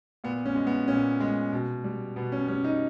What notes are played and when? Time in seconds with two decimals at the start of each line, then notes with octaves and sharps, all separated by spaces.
0.24 A#2 B3
0.45 C#4
0.55 G#3
0.67 B3
0.88 A#2 C#4
1.20 G#3
1.53 B2
1.84 G3
2.16 B2 B3
2.32 C#4
2.48 G3 C#4
2.64 D#4